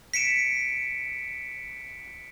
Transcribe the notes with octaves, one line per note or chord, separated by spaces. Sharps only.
B6 C#7 D7 E7